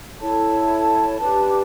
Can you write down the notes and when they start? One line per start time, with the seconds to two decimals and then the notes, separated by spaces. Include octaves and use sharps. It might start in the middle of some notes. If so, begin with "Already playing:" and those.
0.21 E4 A4 C#5 A5
1.19 D4 G4 B4